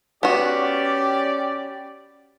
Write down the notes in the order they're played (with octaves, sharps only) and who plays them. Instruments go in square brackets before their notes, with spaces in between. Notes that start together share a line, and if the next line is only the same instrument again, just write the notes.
[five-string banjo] B3 F#4 [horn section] C#4 G4 D5